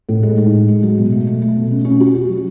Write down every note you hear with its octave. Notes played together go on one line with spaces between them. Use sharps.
A2
G#3
D#4
A2
G#3
F#3
B2
A3
A3
A3
B2
C#4
C#4
F#4
F#4
F#3